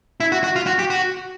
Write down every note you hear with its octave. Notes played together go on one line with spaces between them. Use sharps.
E4
F#4
F#4
F4
F#4
G4
F#4